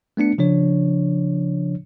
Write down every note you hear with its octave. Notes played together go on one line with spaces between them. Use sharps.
A3 B3 D4 C#7
C#3 F3 D4 C#5